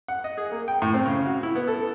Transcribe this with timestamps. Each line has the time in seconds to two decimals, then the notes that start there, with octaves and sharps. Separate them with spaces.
0.08 F#5
0.24 D#5
0.38 G#4
0.51 A#3
0.68 G5
0.82 A2
0.94 C4
1.05 C#3
1.26 F#4
1.43 E4
1.55 B3
1.68 A4